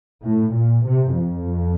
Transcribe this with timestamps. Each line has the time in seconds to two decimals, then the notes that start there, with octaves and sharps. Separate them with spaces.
0.23 A2
0.55 A#2
0.86 C3
1.17 F2